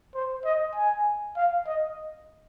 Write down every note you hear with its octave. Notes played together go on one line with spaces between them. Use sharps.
C5
D#5
G#5
F5
D#5